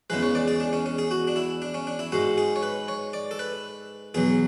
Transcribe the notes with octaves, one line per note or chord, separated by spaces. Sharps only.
E2 C#3 E3 G#3 B4
C#5
D5
G#4
D4
C#4
C#4
G#4
F#4
D4
E4
D4
C#4
D4
E4
G#2 G#3 F#4
G#4
C#5
B4
C#5
D5
A4
B4
E2 B2 F#3 G#4